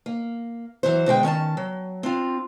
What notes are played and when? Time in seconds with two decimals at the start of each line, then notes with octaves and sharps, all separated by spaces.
0.06 A#3
0.83 E3 F#3 C5
1.06 B2 D3 G#3 G5
1.23 D#3 C#4 G#5 A5
1.57 F#3
2.03 C4 D4 F4